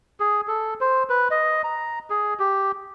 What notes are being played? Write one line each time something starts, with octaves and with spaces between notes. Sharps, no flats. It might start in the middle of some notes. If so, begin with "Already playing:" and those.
G#4
A4
C5
B4
D#5
A#5
G#4
G4